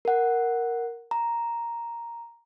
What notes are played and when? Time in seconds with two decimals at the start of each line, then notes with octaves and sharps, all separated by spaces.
0.05 A#4 F#5
1.11 A#5